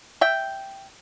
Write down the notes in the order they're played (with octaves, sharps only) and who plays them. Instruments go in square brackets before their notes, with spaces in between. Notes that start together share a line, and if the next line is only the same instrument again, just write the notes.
[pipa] E5 G5